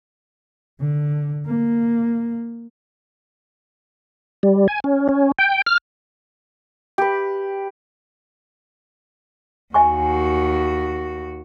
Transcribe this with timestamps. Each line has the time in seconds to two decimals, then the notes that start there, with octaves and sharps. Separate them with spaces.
0.80 D3
1.46 A#3
4.43 G3
4.68 G#5
4.84 C#4
5.09 C#4
5.39 G5
5.66 F6
6.98 G4 B4
9.74 D#2 F#4 E5 G#5 C#6